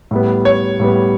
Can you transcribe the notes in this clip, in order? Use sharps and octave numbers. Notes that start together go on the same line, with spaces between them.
A2 G3 B3
C#5
A2 G3 B3